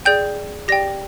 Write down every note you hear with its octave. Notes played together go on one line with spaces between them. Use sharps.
G#4 D5 G5 G6
G4 D5 G5 A#6